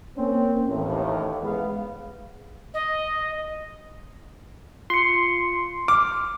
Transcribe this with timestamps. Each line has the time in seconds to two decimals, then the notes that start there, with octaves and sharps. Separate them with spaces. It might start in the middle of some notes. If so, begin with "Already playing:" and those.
0.17 A#3 C4 C#4
0.68 A1 D#2 A2
1.42 G#3 B3 F5
2.74 D#5
4.90 F4 C6 C#7
5.88 D6 F6